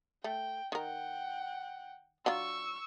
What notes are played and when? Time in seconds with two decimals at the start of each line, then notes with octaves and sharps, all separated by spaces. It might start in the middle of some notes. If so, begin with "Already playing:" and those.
0.24 A3 G5
0.72 D#3 A#4 F#5 G5
2.26 F#3 D4 F4 C#6 E6